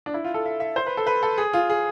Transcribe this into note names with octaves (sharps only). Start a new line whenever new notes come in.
D4
E4
F4
A4
E5
E5
C5
B4
A4
B4
A4
G#4
F4
G#4